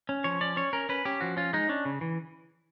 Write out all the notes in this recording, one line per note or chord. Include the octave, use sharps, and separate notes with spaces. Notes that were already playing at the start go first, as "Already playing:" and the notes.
C#4
F3 C#5
C#4 D5
C#4 C#5
C#4 A#4
C#4 B4
C#4 G4
F3 F#4
C#4 F4
G#3 D#4
C#4 D4
C#3
E3